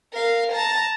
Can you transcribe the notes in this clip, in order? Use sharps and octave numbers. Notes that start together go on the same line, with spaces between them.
A#4 F5
A5 A#5